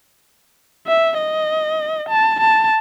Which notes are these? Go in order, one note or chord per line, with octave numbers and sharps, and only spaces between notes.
E5
D#5
A5
A5